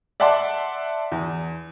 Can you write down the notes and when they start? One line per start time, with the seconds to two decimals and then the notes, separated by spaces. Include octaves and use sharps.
0.20 D5 E5 F#5 A5 C6 D6
1.12 E2